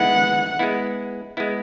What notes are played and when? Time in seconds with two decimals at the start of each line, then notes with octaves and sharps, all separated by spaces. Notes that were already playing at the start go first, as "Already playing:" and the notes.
Already playing: G#3 B3 E4 F#5
0.59 G#3 B3 E4
1.37 G#3 B3 E4